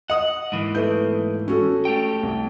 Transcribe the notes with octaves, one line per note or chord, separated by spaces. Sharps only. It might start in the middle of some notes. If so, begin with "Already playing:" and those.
D#5 F#5 D#6
G#2 E3 A#3
A3 B3 G6
C#4 F#4 A4
A3 G4 G5
C2